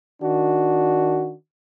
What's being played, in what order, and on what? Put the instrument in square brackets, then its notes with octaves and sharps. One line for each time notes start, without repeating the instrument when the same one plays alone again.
[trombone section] D#3 D4 F#4